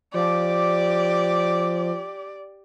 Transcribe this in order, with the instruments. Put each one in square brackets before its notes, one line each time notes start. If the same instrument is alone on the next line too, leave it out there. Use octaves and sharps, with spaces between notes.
[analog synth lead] F3 [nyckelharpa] G4 D6 [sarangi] D5